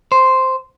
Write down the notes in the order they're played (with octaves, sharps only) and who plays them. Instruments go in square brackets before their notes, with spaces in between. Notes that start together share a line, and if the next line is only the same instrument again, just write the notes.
[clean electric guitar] C5